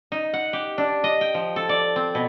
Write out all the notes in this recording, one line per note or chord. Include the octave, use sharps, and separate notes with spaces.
D#4
F#5
G4
D4
D#5
G5
F3
A4
D5
C4
B2